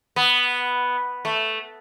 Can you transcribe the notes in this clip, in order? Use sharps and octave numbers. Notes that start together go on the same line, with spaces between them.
B3
A3